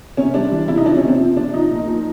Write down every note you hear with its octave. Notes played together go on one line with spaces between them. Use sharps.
C3 C#4
G3 D4
E3
C3 E4
D#4
F3 D4
C#4
C3
C4
F3
C3 D4
F3 D#4
A#2
F3